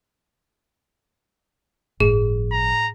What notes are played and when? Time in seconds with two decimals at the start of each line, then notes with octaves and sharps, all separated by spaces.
2.00 G1 A2 F3 G#4
2.52 A#5